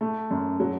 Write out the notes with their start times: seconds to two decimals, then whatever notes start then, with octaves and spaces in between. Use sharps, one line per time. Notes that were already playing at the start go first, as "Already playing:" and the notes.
0.01 A3
0.31 F#2
0.60 F#3